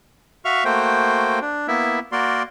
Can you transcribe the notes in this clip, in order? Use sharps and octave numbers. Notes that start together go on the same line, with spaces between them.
F#4 E5 F5 C#6 F6
A3 A#3 F#4 C5 G5
D4
A#3 B3 E4 E5
A#3 F#4 A#4 D5 C6